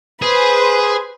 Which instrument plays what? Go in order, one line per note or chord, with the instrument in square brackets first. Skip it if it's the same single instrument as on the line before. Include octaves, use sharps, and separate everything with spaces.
[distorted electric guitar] G#4 [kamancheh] B4 C5